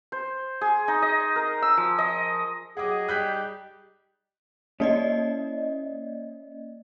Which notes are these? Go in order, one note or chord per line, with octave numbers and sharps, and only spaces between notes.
C5
G#4
D#4
D#5
A#4
E6
F3
D#5
F#3 G4 G#4 D#5 F#5 D6
G3 D#4 G4 F#6 G6 B6
A#3 C#4 E4 A4 D5 D#5